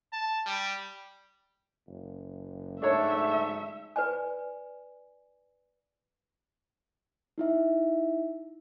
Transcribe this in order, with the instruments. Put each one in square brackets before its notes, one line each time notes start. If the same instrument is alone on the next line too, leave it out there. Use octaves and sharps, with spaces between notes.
[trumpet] A5
G3
[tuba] F#1
[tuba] G#2 [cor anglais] A3 [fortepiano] D4 A4 C#5 [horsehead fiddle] E5
[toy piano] B4 D5 G#5
[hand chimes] D#4 E4 E5